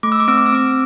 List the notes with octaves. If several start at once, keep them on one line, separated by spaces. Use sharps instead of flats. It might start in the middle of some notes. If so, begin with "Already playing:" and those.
A3 D6
E6
D6
C4 E6
D6
E6
C4 D6